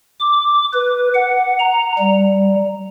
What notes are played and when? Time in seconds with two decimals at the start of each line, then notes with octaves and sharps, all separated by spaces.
0.20 D6
0.73 B4
1.15 F#5
1.60 A#5
1.99 G3